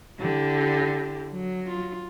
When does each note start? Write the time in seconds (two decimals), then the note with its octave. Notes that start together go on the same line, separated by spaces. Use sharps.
0.20 D3 E4 G4
1.33 F#3
1.67 F4